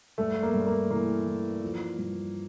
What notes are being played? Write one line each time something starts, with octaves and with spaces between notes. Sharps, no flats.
G2 A3
A#3
G2
A#3
E3 A#3
E3
F3
G2